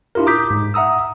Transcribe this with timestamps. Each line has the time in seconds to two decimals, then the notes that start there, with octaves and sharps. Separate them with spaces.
0.15 D4 E4 F4 G4 A#4
0.27 A#5 D6 D#6 G6 B6
0.51 G#2
0.74 E5 F#5 A#5 D#6 E6